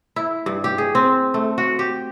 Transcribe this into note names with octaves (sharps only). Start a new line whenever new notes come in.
E4
G2
G4
G#4
C4
A3
F#4
G4